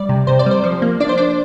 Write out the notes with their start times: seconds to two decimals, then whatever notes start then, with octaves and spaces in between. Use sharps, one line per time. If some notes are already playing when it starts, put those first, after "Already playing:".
Already playing: G3 D5
0.09 C3
0.27 C3 C5
0.39 D5
0.46 G3 C5
0.63 F3
0.82 A#3
1.00 D4 D5
1.09 C5
1.17 D4 D5